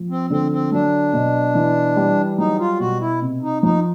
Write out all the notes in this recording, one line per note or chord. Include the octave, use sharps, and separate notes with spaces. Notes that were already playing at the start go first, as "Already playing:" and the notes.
Already playing: F3
C4
D3 C4
C4
F#3 D4
B2
E3
G3
F#3 D#4
F4
B2 F#4
E4
C3
D#4
F3 D#4